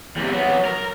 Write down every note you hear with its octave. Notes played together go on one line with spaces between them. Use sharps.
E2 C3
F#3 B3
A#4